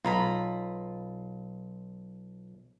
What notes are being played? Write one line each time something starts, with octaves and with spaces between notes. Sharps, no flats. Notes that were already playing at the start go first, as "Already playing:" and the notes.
B1 F4 A#5 B5